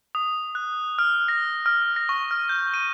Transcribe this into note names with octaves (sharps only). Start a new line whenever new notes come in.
D#6
F#6
F6
A#6
F6
A#6
C#6
F6
G6
D#7